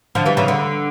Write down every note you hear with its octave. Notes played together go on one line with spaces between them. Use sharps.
D3 F3
E3 G3
C#3 E3
D3